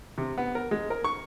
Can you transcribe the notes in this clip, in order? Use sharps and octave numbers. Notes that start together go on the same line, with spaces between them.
C3
B3
A#4
G#3
A#4
C#6